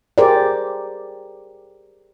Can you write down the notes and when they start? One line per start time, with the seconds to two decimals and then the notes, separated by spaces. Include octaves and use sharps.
0.18 G4 G#4 A#4 C5 D5